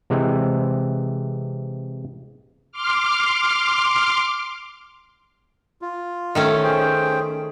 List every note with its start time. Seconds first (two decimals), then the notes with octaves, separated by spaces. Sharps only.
0.10 C3 E3 G#3 C4
2.72 C6 D6 F6
5.82 F4
6.35 D#3 A3 C#4
6.63 G#4 C5 G5